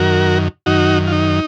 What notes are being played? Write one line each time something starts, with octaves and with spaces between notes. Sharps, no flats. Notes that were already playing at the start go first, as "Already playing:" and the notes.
Already playing: F#2 D#3 F#4 A#4
F#2 D#3 D#4 F#4
F4
D#4